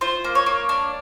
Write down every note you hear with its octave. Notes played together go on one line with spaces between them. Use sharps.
F4 C5
A#3
C#5
A#3
D4